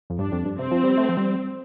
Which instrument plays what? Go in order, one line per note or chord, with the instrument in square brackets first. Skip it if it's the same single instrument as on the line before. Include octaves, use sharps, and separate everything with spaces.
[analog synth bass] F2
[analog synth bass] G2 [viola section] D4
[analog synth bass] F2
G2
[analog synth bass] C3 [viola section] C4
[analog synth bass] F3
G3
A3
F3
G3